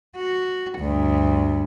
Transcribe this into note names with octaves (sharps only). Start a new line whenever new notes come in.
F#4
D2 G2